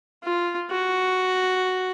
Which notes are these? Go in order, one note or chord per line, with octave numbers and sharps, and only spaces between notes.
F4
F#4